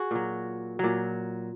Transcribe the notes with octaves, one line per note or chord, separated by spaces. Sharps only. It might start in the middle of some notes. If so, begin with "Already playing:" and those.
Already playing: F#4 G#4
A#2 F#3
A#2 F#3